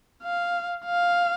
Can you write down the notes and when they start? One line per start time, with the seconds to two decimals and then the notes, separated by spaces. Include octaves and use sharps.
0.23 F5
0.85 F5